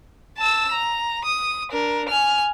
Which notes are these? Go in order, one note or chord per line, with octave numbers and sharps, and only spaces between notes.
A5 E6
A#5
D#6
D4 A#4
G#5 F6